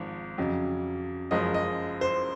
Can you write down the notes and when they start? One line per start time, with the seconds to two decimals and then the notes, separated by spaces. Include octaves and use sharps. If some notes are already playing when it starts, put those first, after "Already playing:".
Already playing: G#1 G#2 F3
0.38 F2 C#3 F#3
1.31 F#1 F#2 F3 G#3 D#5
1.54 D#5
2.01 C5